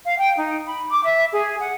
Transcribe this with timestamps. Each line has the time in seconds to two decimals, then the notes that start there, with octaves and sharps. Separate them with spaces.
0.05 F5
0.18 G5
0.36 D#4
0.67 B5
0.90 D6
1.05 E5
1.32 G#4
1.60 F#5